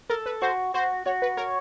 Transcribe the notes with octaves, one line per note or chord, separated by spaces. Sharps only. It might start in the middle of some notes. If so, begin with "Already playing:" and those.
A4 A#4
B4
F#4 C5
F#4 C5
F#4 C#5
B4
A#4 C#5